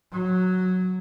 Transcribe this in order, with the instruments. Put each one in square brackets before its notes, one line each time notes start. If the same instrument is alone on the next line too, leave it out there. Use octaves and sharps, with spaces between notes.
[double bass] F#3